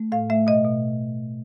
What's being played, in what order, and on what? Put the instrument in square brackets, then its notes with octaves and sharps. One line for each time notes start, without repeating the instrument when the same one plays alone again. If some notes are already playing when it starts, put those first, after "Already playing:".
Already playing: [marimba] A3
A2 F5
A3 E5
B2 D#5
B2